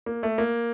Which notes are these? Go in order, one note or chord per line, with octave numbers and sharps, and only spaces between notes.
A#3
A3
A#3